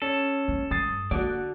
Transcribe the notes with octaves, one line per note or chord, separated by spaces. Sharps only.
C#4 A4
A#3
G2 D#6 A6 C7
D3 A#3 F#4 A4 D5